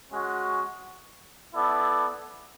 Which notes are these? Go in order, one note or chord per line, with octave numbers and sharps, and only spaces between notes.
G#3 C#4 F#4
B3 E4 A4 D5